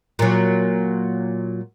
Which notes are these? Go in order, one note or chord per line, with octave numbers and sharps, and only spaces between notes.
A#2 F#3